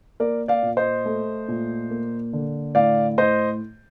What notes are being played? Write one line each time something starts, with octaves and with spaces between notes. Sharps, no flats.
A#3 A#4 D5
D5 F5
A#2
C5 D#5
A3
A#2
A#3
D3
A2 D5 F5
A2 C5 D#5